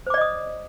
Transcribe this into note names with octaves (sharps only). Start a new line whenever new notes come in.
C5 D5 D#5 D6 D#6